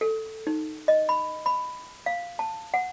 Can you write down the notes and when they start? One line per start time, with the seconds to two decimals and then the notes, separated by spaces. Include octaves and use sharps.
0.01 A4
0.47 D#4
0.88 D#5
1.09 B5
1.46 B5
2.06 F5
2.39 A5
2.74 F#5